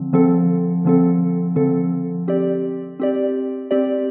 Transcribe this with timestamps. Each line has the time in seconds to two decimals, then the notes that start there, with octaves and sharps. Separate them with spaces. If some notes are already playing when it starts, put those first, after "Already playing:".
Already playing: D3 F3 C4
0.13 D3 F3 C4 A4
0.85 D3 F3 C4 A4
1.56 D3 F3 C4 A4
2.28 C4 G4 D5
3.00 C4 G4 D5
3.71 C4 G4 D5